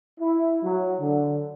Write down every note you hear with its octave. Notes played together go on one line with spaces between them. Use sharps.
E4
F#3
D3